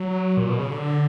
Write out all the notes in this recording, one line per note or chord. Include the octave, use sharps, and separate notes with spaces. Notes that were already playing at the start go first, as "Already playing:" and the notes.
Already playing: F#3
A#2
B2
C#3
D3